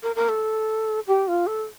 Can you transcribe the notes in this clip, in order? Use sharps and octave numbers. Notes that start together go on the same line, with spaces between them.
A#4
A#4
A4
G4
F4
A4